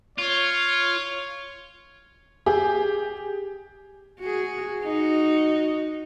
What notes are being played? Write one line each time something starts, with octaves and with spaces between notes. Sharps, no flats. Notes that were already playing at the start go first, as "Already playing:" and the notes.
F4 C#5
G4 G#4
F#4 G#4
D#4 F#4